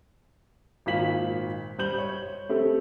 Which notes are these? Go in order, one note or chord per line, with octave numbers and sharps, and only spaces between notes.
G#1 A#2 F5 B6 F#7
G3 C5 G6 F#7
C#5
A3 C4 G4 A4